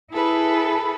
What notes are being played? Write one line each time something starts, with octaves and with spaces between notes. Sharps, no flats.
E4 G#4 A4 B4